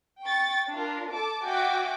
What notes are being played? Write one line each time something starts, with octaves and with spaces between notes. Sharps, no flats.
G5 C#6 A6
D4 F4 A#4
A4 A5 D6
F#4 D5 E5 G5 G#5 D6